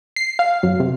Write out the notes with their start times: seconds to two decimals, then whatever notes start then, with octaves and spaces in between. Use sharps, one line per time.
0.16 C7
0.39 F5
0.63 F#2
0.80 C3